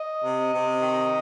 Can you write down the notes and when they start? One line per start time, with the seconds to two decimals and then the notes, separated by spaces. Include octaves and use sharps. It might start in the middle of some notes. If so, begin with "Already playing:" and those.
Already playing: D#5
0.22 C3
0.51 C3
0.81 D#3